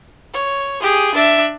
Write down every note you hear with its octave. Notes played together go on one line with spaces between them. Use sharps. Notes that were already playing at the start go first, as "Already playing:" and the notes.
C#5
G4 G#4
D4 E5